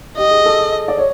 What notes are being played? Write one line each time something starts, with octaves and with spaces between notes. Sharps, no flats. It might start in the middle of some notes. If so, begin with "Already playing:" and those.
G4 D#5
G#4
A4
D5
C#5